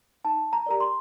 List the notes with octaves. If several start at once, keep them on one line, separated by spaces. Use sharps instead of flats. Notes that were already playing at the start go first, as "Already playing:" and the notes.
D#4 A5
A#5
G4 A#4 D5 A#5
C6